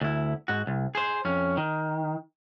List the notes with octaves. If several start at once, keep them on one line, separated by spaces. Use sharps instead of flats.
D2 E4
G#2 F#4
C2
G#4 C5
F2 C#4
D#3